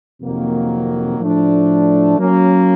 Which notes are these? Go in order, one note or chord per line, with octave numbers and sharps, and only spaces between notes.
F2 C3 D#3 F#3 A#3
A2 F3 A3 D4
F#3 A#3 C#4